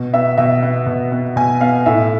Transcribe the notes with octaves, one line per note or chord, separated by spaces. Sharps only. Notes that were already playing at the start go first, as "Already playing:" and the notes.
Already playing: B2
B3 E5
B2 E5
B3
B2
B3
B2 G#5
B3 F5
A2 E5